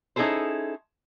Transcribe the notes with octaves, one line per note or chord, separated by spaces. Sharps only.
C#4 D#4 E4 G#4 A4 C5